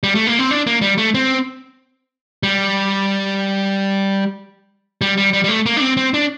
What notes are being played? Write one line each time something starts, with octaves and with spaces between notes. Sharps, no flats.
G3
A3
A#3
C4
D4
A#3
G3
A3
C4
G3
G3
G3
G3
G3
A3
A#3
D4
C4
C4
D4